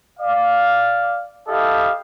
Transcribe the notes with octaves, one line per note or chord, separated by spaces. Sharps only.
D5 F5
E4 G4 A4 D#5 F5